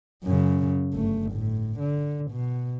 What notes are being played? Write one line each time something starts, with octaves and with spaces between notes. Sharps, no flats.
F#2 C#3
G1 A3
A2
D3
B2